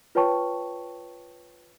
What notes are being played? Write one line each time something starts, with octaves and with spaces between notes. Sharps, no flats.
F4 B4 C#5 G5 A5 C#6